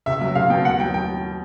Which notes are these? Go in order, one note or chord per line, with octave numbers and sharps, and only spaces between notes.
C#2 E5
F#3 E5
C#2 F5
B2 G5
D#2 F#5
F#3 G5
G5